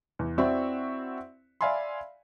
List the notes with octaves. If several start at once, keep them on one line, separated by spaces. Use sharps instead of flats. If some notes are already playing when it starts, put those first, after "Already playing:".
E2
C4 E4 F#4 C5 D5 E5
D5 E5 F5 G#5 B5 C6